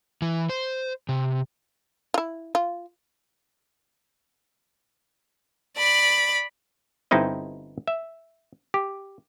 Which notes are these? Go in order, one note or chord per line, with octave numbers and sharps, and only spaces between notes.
E3
C5
C3
E4 F4
F4
D5 B5
G1 G2 C4 D#4 E4 D#5
E5
G4